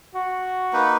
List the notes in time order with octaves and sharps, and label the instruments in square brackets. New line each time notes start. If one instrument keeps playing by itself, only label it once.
[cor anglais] F#4
[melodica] A#3 D#4 B4